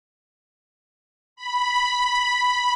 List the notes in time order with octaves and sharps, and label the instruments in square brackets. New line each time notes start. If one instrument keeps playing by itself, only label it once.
[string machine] B5